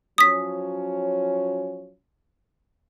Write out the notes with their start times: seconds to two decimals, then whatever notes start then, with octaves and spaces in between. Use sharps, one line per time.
0.18 F3 F#3 C#4 D#6 B6